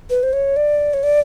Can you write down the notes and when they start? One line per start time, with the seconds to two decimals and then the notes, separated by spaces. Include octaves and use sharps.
0.10 B4
0.23 C5
0.33 C#5
0.56 D5
0.94 C#5
1.03 D5